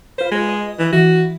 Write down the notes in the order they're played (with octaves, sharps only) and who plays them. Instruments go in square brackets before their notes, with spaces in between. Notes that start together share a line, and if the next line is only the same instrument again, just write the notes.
[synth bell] F4 B4 [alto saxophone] C5
[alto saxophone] G#3
[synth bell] D#5
[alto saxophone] E3
[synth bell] E3 [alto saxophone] F#4